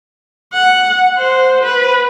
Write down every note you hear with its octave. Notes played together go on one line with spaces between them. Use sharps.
F#5
C5
B4